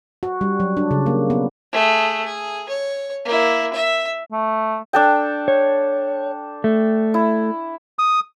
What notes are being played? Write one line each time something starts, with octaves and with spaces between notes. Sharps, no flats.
F#4
G3
F#3
D4
C#3
A#3
B3
A3 G#4
G#4
C#5
A#3 E4
E5
A3
D4 A4 G5
C#5
A3
E4
D#6